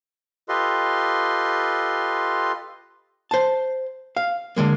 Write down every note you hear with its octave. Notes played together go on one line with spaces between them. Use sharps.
F4 G4 A4 B4 D#5 C6
C5 A5
F5
D3 F3 G#3 A#3